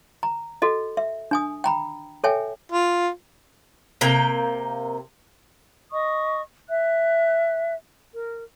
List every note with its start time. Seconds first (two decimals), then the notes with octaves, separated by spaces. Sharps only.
0.23 A#5
0.62 F#4 A4 D#5
0.97 E5
1.31 D4 G#5 D#6
1.64 G5 A#5 B5
2.24 A4 C#5 E5 G5 G#5
2.72 F4
4.01 C3 A#3 G5
5.91 D#5 C#6 D#6
6.69 E5 F#6
8.12 A#4